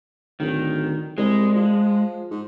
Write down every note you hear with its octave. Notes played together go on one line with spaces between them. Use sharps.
D1 D#3
C2 G#3
F3
G#2